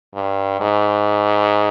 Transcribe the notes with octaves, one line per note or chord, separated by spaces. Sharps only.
G2
G#2